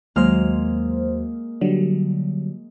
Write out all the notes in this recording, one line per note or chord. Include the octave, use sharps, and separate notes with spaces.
D#2 F#3 G#3 A#3 C5 F6
D3 F#3 G3